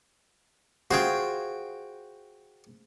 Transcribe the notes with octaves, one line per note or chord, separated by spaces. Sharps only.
F4 F#4 G#4 C5 G5